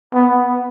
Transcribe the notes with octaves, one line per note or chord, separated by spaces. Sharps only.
B3